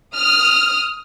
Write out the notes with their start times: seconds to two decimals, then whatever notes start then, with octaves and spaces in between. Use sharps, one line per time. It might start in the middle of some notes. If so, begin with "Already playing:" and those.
0.18 D#6 F6